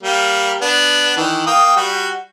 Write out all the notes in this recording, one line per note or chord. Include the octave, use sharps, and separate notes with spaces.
G3 A#3
B3 D4
D#3 E3
A#3 G5 D#6
G3 F#4